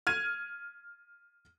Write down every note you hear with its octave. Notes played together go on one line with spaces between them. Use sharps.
F6 G#6 D#7